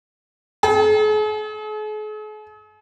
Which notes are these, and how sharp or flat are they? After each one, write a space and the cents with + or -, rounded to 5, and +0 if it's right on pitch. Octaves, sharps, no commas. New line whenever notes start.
G#4 +45